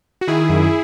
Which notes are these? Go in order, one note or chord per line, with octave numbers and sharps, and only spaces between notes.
F#4
D#3 E4 G#4
F#2